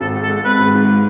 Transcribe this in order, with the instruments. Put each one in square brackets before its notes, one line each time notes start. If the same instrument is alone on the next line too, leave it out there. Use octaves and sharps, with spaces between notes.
[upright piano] G#1 [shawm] A4
[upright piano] G#2
[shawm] A4
[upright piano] G#3
[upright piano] C4 [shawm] B4
[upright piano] G#1
G#2